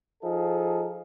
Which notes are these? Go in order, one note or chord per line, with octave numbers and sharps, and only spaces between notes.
F3 D#4 G#4 A4